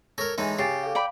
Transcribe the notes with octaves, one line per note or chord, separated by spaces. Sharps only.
A4 A#4 C#5 A#6
A2 E3 G#3 D#4
C#3 G4 G#5 A6 C7
A4 F5
D5 F5 G5 B5